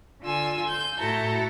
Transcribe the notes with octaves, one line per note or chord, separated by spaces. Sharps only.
D3 F4 G#5 E6
G6
A2 E4 F#4 A4 A#5